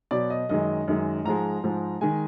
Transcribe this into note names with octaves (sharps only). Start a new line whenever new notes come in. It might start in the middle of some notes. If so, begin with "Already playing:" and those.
B2 F#3 D5
D#5
F#2 D#3 G#3 D#5
F#2 D#3 G#3
G#2 F3 G#3 A#5
G#2 F3 G#3
D#3 G#3 G#5